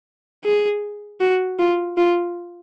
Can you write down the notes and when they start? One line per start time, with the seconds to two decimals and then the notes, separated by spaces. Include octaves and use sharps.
0.45 G#4
1.21 F#4
1.59 F4
1.97 F4